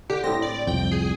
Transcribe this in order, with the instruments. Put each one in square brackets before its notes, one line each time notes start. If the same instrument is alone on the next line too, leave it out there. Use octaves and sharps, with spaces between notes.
[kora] D3 [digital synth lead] G4
[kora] A2 C4 [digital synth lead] A#6
[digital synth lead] D5
[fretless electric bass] C2 F2 [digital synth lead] G5
[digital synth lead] G#4